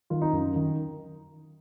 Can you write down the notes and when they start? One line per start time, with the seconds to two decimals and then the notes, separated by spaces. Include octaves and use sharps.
0.10 D#3 F4
0.22 D#4
0.33 F#2
0.56 D#3